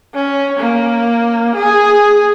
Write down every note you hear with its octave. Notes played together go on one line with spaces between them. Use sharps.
C#4
A#3
G#4